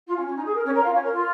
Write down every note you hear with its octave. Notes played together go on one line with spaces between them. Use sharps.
F4
C#4
C#4
D#4
G#4
A#4
C#4 C#5
A#4 A#5
F4 F5
C#4 C#5
A#4
F4